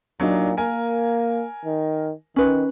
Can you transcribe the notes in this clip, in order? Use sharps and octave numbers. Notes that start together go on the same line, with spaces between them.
A#2 F#3 D4 D#4
A#3 A#4 G#5
D#3
D#3 C#4 B4